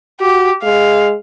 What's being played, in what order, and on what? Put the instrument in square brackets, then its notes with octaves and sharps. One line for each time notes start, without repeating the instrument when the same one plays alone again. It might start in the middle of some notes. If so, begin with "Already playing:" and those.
[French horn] F#4 [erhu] G4
[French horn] G#3 [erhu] F5